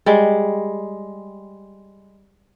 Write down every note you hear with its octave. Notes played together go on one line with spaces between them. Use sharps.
G3 G#3